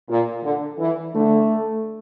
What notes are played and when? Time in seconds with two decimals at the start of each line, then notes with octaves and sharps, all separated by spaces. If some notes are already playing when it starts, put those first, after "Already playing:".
0.09 A#2
0.44 D3
0.79 E3
1.14 D3 A3